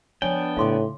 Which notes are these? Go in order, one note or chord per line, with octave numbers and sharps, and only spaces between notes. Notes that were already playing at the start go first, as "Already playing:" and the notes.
F3 B3 D4 C#5 D5 G5 G#5
A2 C#3 D#4 F5 C6 D6